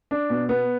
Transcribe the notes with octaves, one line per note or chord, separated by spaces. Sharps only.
D4
B2
B3